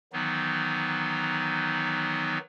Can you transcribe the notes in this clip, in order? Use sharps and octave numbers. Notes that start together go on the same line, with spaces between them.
D#3 E3 F#3 B3 D#4